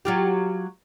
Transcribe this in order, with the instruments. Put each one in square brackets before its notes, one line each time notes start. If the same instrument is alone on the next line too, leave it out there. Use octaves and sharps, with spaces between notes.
[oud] F#3 F4 G4